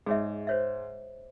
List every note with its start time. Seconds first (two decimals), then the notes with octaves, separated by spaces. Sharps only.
0.06 G#2 G#4 C#5 E5
0.47 C5 C#5 E5